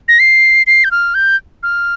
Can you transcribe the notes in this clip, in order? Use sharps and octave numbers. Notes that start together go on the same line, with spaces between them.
A#6
C7
C7
G6
F6
G6
F6